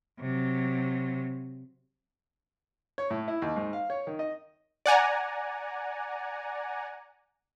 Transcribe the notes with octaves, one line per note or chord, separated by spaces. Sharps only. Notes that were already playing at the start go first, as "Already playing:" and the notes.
C3 F#3
C#5
A2
E4
D#2
G#2
F5
C#5
D#3
D#5
D5 F#5 G#5 A#5